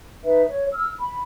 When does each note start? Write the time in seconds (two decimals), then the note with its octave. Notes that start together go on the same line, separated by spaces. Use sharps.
0.23 D#4 B4 E5
0.49 C#5
0.73 E6 F6
1.00 B5